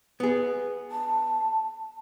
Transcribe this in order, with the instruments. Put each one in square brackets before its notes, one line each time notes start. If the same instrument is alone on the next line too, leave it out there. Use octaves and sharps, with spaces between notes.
[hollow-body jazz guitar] B3 G#4
[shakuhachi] A5